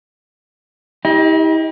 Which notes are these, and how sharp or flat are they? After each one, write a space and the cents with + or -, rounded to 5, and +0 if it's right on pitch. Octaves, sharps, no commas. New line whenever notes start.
E4 -45 G4 +10 D#5 +20